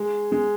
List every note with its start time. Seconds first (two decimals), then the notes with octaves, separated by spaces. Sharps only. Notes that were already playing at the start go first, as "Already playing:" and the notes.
Already playing: G#3
0.32 G#3